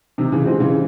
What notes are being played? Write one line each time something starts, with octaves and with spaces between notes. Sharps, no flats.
C3 D#3
C#3 E3
G#3 C4
C#3 E3